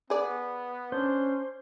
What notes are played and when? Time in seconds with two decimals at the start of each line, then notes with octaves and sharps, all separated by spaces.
0.10 B3 G#4 D5
0.92 C#4 D4 C5